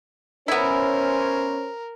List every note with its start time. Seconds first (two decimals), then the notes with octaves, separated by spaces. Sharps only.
0.48 B3 C#4 E4 A#4 C5